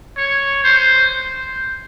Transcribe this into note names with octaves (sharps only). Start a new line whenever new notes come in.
C#5
C5